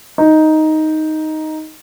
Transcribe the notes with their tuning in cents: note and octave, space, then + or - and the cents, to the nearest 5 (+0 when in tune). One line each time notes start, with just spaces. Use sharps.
D#4 +5